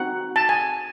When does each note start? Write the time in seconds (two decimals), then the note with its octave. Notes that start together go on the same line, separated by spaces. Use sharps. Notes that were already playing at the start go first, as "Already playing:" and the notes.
Already playing: C4 D#4 F#4 F#5
0.36 A5
0.49 G#5